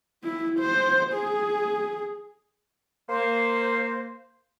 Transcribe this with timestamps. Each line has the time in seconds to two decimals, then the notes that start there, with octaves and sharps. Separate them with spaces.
0.24 E4
0.60 C5
1.14 G#4
3.09 A#3 C5